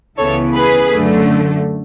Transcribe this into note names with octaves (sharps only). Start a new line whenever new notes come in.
C#2 C#3 E3 B3 A4 C#5
G#4 B4
F#2 D3 A3